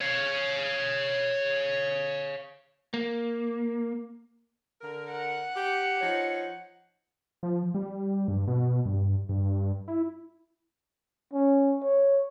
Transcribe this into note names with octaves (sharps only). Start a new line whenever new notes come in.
C#5 F5
A#3
D3 A#4
F#5
G4
F3 D#4 C#5
F3
G3
G2
B2
G2
G2
E4
C#4
C#5